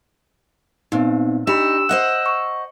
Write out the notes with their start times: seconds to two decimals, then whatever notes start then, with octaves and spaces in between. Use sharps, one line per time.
0.92 A#2 B3 C4 D#4
1.47 D4 D#4 G4 B5 E6
1.89 C5 D#5 F#5 F#6
2.26 C#6